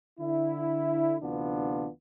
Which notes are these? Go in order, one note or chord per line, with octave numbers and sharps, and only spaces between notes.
D3 E4
D2 C3 E3 B3 D4 F4